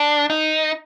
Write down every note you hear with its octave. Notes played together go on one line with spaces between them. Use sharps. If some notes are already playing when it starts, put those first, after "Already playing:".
Already playing: D4
D#4